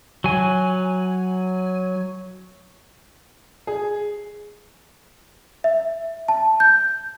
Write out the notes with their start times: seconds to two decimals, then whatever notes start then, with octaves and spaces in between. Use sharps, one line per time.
0.24 F#3 G#5
3.67 G#4
5.64 E5
6.28 A5
6.60 G6